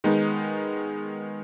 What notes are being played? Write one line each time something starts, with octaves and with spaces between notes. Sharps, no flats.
D#3 G#3 B3 D#4